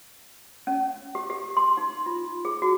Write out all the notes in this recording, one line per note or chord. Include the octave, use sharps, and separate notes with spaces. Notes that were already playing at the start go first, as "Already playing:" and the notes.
C#4
G4
G4
C6
D#4
F4
G#4
F#4